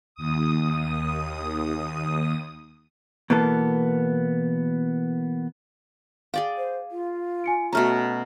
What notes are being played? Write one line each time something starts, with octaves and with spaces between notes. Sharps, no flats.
D#2 D#6
B2 E3 A#3 B3 A4
G#4 D5 F5 G5
C5
F4
G#5 C#7 D7
B2 A3 C#4 A#5 F6